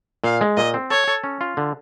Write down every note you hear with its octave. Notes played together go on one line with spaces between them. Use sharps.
A#2 F5
G#3
A#2 D#5
C4
A4 C#5
A4
C#4
F4
D3